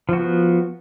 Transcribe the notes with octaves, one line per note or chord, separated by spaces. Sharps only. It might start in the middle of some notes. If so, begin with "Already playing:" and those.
F3 B3 F#4